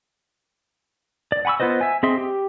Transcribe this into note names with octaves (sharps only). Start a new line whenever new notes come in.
D5
F#5 G#5 B5 C#6 E6
B3 F4 B4 C5 D#5
E5 G#5
C4 G#4 D#5 E5 C6
G4